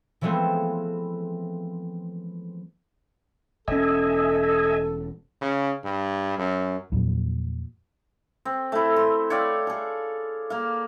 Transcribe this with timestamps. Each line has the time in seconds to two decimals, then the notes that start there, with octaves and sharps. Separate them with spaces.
0.21 E3 F3 G#3 A3 B3 C4
3.68 E1 C#4 A4 D#5 E5 G#5
5.42 C#3
5.84 G2
6.38 F#2
6.92 E2 A#2 F3 F#3
8.45 C4
8.72 A3 E4
8.96 C6
9.30 C#5 D5 F5 G5
9.67 G#4 A4
10.50 A#3 F5